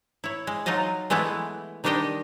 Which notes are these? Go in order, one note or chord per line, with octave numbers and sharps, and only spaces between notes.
E4 C#5
G#3
F#3 D#4 F4 D#5 A5
E3 G#3 A3 B3 E4
D#3 G3 D4 G4 D#5 G5